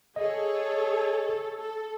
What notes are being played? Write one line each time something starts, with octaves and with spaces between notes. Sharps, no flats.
G#4 A4 C#5 D#5
A4